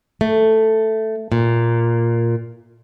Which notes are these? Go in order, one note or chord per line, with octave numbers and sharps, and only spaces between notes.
A3
A#2